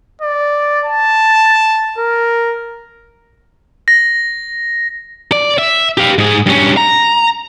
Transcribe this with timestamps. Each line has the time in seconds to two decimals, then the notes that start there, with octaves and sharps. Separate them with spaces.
0.22 D5
0.85 A5
1.98 A#4
3.88 A#6
5.32 D5
5.58 E5
5.98 G4 F5
6.18 G#2 G#4
6.46 G2 C#4
6.77 A#5